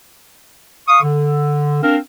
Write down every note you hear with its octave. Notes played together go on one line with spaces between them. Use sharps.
F5 C#6 D#6
D3
C4 D4 A#4 F5